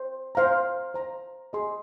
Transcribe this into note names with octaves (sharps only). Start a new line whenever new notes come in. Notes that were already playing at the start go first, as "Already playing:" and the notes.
Already playing: C5
C5 F5 A#5
C5 F5 A#5
G#4 D#5 C6